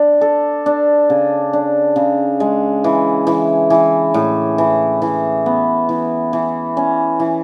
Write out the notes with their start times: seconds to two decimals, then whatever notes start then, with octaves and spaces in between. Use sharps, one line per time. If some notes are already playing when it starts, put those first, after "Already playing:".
Already playing: D4
0.21 A4
0.66 D4
1.10 C#3
1.53 D4
1.96 C#3
2.40 G#3
2.84 E3
3.27 E3
3.70 E3
4.14 A2
4.58 E3
5.02 E3
5.46 B3
5.89 E3
6.33 E3
6.77 C#4
7.20 E3